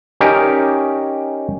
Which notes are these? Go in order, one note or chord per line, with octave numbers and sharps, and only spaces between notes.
C#4 D#4 G4 A#4 D5